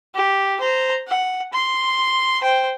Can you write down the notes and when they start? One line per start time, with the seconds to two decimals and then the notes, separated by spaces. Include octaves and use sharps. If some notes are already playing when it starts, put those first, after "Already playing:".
0.15 G4
0.60 C5 A#5
1.08 F#5
1.53 C6
2.41 C5 G5